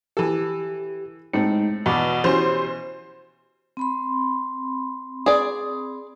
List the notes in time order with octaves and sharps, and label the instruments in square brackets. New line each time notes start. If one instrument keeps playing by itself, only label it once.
[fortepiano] E3 A4 [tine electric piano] G4
[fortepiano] A2 C4 [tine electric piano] G#3 D#4 C#7
[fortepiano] E2 [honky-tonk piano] B2 [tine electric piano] B5 D6
[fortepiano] B2 E3 C#4 [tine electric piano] G4 C6 [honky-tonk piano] C5
[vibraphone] C4 B5 C6
[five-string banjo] G#4 D5